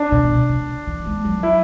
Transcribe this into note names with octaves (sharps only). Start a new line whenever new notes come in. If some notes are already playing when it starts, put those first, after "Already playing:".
Already playing: D4
B2
C#3
C#3
E3
G#3
F#3
E4